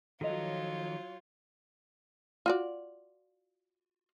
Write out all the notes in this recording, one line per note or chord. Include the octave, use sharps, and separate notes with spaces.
D#3 F3 F#3 F4 A4 C#5 D#5 A#5
F4 F#4 D5